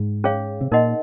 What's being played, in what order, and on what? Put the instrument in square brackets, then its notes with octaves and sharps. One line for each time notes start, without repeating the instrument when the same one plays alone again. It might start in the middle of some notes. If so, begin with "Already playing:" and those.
Already playing: [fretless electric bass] G#2
[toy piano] C#4 G#4 C#5 F5
[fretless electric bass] C3
[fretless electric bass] A#2 [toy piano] D#4 A#4 D#5 F#5 C6